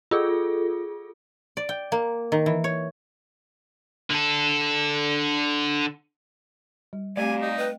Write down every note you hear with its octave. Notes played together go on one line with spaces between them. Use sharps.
F4 G#4 A4
D5
G5
A#3
D#3
E3
C#5
D3 A4
G3
A3 C4 G4 D5 F5 G#5
D#4 D#5
B4 D#5 F5 G5